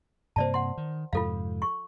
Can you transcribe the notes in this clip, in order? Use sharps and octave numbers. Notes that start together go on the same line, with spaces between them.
G2 C3 A#3 C5 D5 A5
F#5 C6
D#3
F2 G#2 C3 F4 A4 F5
C#6